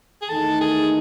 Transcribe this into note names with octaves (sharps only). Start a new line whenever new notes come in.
G#4
E2 D#3 A3 D#4 A4
G#4